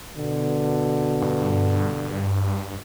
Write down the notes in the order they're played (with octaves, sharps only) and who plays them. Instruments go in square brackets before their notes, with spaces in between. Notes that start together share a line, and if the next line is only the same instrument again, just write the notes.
[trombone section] B2 D3
[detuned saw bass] G2